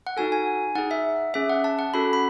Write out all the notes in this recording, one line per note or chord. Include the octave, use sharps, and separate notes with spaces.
F#5
D#4 F#4 A4 G#5
G#5
D#4 G#4 F#5
E5
C#4 G#4 E5
F#5
A5
F#5
C#4 F#4 A4 B5
B5